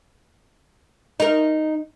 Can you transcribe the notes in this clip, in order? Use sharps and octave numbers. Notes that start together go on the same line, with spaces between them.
D#4 A#4